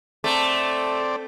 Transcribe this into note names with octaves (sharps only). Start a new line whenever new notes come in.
A3 C4 D5